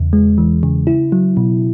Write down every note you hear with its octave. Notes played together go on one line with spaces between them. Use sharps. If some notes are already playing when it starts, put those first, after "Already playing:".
Already playing: E2 C#3
G#3
E3
C#3
E4
F#3
B2